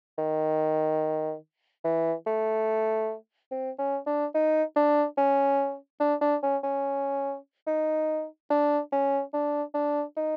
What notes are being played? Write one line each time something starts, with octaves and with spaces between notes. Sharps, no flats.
D#3
E3
A3
C4
C#4
D4
D#4
D4
C#4
D4
D4
C#4
C#4
D#4
D4
C#4
D4
D4
D#4